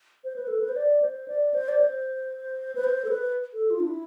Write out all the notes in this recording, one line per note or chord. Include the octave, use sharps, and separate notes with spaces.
C5
B4
A4
B4
C5
D5
C5
D5
C5
D5
C5
B4
C5
A4
B4
A4
F4
D4
E4